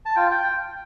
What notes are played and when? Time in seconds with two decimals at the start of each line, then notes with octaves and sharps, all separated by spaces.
0.05 A5
0.16 F4 G5
0.31 G5